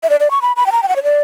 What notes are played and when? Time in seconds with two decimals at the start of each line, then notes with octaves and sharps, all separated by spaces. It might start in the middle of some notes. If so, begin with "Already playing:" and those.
0.03 E5
0.10 D5
0.20 D5
0.31 C#6
0.42 B5
0.57 B5
0.66 G5
0.72 A#5
0.83 G5
0.88 F#5
0.96 C#5
1.03 D5